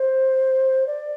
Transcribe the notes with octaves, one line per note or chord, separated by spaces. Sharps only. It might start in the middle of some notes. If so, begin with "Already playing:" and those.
Already playing: C5
D5